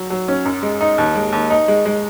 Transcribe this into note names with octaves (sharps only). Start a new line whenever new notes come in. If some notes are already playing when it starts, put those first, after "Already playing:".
Already playing: F#3
F#3
C#4
F#2
G#3
D#4
D#2
G#3
D#2
D#4
G#3
G#3